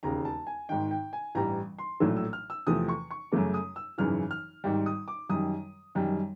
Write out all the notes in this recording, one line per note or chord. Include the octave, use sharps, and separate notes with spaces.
E1 D#2 C#3 A#5
A5
G#5
G#1 G#2 D#3 G5
G5
G#5
A1 G2 E3 G3 A#5
C6
A#1 A2 F#3 A3 E6
E6
F6
E6
E2 C3 F3 A3 D#6
C#6
C#6
F#2 C#3 F#3 A3 D6
D#6
E6
G#1 F#2 C#3 E3 F6
F6
G#1 G#2 D#3 G3
D#6
D6
F#2 D#3 G3 D#6
F#2 D#3 G3